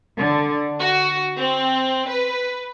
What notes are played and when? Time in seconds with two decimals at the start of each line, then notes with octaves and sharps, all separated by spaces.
0.17 D3
0.79 F#4
1.37 C4
2.07 B4